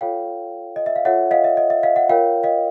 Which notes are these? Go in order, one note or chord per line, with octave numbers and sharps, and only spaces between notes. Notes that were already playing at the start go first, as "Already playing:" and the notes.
F4 A4 C#5 F5 G5
D#5
E5
F5
F4 A4 C#5 E5 F#5
D#5 F5
E5
D#5
E5
D#5 F5
E5 F#5
F4 A#4 C#5 F5 G5
D#5 F5